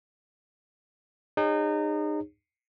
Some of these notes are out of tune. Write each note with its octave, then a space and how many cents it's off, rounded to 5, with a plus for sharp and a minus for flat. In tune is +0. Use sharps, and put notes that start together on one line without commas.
D#4 -30 G#4 -35 C#5 -20